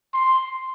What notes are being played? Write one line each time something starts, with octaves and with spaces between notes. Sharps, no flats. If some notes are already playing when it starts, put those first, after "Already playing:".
C6